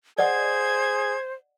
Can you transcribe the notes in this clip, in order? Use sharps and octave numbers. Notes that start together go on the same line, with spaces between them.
G#4 C5 D5 D#5 F#5 G#6